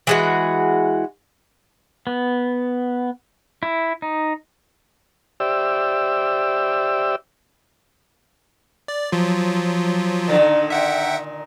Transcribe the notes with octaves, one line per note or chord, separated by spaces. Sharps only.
E3 G#3 F#4
B3
E4
D#4
G4 C5 D5 E5 G5 E6
D5
F3 F#3 F4
A#2 D3 D#3
E5 F#5 G5